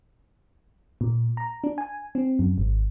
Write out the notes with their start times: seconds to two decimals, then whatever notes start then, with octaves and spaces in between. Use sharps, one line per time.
1.01 A#2
1.37 A#5
1.64 D4
1.78 G#5
2.15 C4
2.39 F#2
2.58 G#1